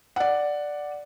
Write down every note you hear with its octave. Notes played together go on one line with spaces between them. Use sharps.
D5 F#5